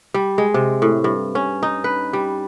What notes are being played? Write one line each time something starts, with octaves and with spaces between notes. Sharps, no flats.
G3
G#3
C3
A2
G2
C#4
D#4
B4
G3